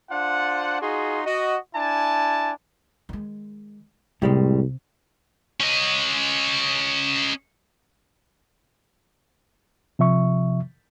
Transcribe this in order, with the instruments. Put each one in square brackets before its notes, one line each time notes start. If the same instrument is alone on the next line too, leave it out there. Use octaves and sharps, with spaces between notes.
[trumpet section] D4 F4 C5 F#5
D#4 F4 F#4 G#4 C6
F#4 D#5
D4 E4 G#5 A5
[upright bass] D#3 G#3
[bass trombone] C2 [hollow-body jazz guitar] A2 G3 G#3 [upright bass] C3
[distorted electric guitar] C#4 D#5
[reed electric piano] C3 F3 E5 C#6